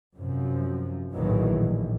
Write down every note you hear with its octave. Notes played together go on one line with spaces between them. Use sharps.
F#2 C3 F3
A#1 D#2 A2 D#3 E3 F#3
A#1